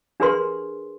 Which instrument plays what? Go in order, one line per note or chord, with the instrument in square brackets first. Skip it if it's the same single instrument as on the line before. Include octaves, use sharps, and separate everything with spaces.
[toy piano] D4 G4 G#4 A#4 B4 C6